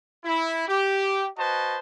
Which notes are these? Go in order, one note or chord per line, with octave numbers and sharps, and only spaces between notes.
E4
G4
F#4 B4 C5 D#5 A5